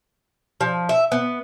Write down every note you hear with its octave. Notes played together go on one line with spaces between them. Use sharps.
F3
E5
B3